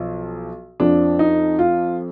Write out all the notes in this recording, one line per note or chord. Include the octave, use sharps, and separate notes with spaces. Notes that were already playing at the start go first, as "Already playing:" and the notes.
Already playing: B1 F3
F2 F3 D4
D#4
F4